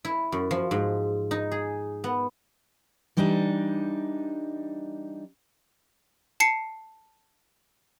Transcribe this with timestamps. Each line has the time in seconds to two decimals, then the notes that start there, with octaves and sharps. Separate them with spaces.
0.05 E4
0.32 F#2
0.51 F3
0.71 G#2
1.31 D#4
1.51 G#4
2.04 B3
3.17 E3 G3 D4 D#4
6.40 A5 C7 C#7